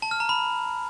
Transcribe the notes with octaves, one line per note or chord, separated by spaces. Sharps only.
A5
F6
A#5
B5